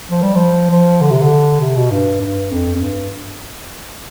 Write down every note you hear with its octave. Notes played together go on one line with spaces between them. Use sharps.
F3
G3
F3
F3
D3
C3
D3
C3
B2
G2
G2
F2
F2
G2